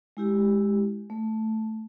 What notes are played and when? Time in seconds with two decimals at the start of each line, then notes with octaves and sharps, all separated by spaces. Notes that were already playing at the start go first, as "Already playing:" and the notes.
0.17 G#3 E4 G4
1.10 A3